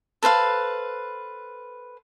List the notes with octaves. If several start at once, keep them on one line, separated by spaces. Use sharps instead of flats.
A4 B4 C5 F5